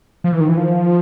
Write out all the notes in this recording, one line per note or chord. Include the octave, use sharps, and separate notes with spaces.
F3
E3
D#3
E3
F3